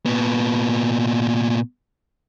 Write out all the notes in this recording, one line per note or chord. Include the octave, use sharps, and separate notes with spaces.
A#2 B3